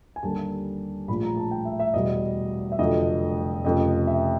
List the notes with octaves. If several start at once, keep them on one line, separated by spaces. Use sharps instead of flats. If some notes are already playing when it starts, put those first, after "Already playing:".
G#5
D#2 D3 G3 A5
A#1 A2 F3 B5
A#5
A5
G5
E5
E5
E2 B2 G3 D#5
E5
F1 F2 D3 F#3 D#5
F1 F2 C#3 D#5
E5